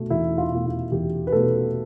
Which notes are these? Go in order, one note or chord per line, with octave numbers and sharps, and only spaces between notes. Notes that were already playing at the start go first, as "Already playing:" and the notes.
Already playing: B2 A3
E2 E4
F4
B2 A3 E4
F4
E2 G4
B4
B2 A3 A4